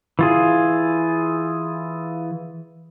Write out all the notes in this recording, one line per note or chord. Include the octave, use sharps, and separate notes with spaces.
E3 F4 G#4